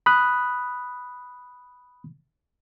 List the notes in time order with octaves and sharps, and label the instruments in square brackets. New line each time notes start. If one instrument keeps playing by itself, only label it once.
[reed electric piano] B5 D#6 F#6